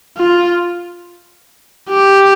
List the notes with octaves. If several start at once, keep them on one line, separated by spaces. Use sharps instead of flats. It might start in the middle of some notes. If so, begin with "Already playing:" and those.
F4
G4